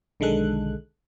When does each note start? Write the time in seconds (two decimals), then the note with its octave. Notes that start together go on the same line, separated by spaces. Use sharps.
0.20 B1 D3 D#3 G#3 A4 F#6